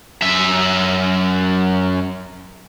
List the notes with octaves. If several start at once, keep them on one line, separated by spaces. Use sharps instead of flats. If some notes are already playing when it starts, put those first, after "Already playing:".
F#2 E5